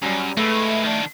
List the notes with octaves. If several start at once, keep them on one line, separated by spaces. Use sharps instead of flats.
F#2 F#3 G3
G#3 A3 E4 A4 B4 E5
D#3 D4